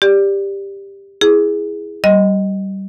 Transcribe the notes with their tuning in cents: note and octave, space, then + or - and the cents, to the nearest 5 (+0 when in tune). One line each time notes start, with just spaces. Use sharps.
G4 +10 D5 +0
E4 +0 G#4 +0
G3 -20 D#5 +0